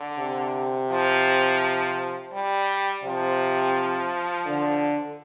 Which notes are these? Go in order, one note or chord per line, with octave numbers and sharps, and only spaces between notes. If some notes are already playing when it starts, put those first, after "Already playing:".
Already playing: D3
C3
F3
G3
C3 F3
D3